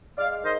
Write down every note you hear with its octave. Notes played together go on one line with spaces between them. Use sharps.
G#3 D5 F5
D#3 C5 D#5